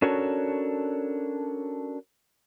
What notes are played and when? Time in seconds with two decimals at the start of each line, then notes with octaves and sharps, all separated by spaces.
0.02 C#4 D4 F#4 A4 A#4 C#5